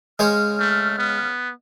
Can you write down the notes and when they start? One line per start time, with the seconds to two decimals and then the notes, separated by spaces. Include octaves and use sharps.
0.19 C#3 G#3 C5 C#5 F6
0.59 A3
0.98 B3